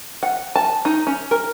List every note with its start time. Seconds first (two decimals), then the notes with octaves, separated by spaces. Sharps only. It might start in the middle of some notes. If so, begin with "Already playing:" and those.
0.23 F#5
0.56 A5
0.85 D#4
1.07 C#4
1.31 A#4